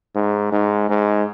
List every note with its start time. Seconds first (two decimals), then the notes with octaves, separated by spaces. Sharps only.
0.15 G#2
0.52 G#2
0.90 G#2